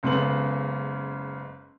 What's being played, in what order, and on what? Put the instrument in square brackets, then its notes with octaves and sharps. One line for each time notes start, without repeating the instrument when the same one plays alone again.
[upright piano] F#1 C#3 G#3 B3 A4 F#7